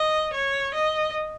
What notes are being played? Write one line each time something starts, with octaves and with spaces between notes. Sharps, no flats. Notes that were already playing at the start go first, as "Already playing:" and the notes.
Already playing: D#5
C#5
D#5